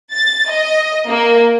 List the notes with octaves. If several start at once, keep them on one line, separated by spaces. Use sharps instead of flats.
A6
D#5
A#3